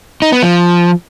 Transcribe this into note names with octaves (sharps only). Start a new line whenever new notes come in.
D#4
B3
F3